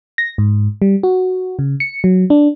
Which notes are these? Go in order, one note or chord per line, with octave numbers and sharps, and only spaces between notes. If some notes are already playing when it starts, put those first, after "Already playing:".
A#6
G#2
G3
F#4
C#3
C#7
F#3
D4